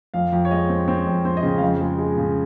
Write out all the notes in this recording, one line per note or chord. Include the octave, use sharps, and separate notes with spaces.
F2 F5
F2
C#5
G#3 D#5
C4
C4 C#5
F2
C4 C5
D#5
C#3
F5
F2 D#5
G#3
G#3
C#3